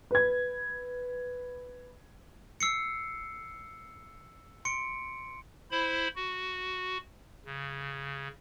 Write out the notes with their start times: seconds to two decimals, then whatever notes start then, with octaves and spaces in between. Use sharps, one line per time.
0.11 B4 G#6
2.60 E6 C7 C#7
4.65 C6 C#7 D7
5.71 E4 C5 B5
6.16 F#4
7.45 C#3